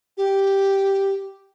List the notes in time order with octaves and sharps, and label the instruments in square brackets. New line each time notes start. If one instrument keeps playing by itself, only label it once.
[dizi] G4